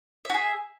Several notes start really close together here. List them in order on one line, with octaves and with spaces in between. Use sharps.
E5 F#4 G#4